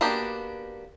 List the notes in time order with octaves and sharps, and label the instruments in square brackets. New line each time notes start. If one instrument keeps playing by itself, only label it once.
[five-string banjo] A#3 B3 D4 F#4 G4